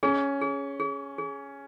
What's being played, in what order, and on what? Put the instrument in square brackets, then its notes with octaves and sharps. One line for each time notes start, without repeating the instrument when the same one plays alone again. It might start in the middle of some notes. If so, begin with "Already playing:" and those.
[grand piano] C#4 [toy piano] G#4
[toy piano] G#4
G#4
G#4